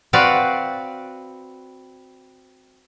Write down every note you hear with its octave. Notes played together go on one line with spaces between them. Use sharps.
C4 F#4 B4 D5 F5